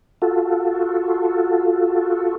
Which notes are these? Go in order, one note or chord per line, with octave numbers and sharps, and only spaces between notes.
F4 F#4 A4